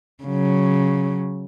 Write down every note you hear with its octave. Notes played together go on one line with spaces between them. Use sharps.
C#3 F#3